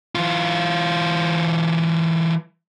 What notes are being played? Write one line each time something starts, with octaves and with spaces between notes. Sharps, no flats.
E3 F4